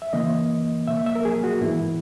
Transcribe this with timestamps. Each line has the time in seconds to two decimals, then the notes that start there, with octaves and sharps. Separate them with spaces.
0.02 E5
0.13 C#3 E3 A#3 D#5
0.87 B2 A#3 E5
1.06 E5
1.15 A#4
1.25 G#4
1.44 F#4
1.61 G#2 E3 B3 E4